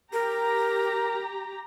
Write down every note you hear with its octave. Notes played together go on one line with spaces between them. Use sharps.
G4 A#4 A#5